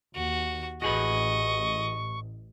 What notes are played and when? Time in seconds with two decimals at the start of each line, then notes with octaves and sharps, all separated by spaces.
0.15 D#2 F#4
0.82 A1 F#4 G#4 B4 D#5 C#6